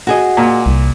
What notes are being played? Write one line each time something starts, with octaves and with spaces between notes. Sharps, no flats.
F#4 G#4 D#5
A#2
C2